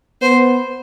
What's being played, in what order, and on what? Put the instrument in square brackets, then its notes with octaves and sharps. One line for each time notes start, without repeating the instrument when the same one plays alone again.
[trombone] B3 [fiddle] C5